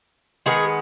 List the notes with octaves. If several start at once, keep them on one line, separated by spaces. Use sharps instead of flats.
D#3 G#3 B3 G#4